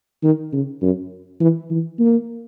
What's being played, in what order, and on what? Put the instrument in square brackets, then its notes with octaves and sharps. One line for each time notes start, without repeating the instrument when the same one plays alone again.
[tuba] D#3
C#3
F#2
E3
E3
A#3